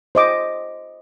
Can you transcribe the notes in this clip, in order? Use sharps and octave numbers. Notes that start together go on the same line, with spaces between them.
C5 D#5 D6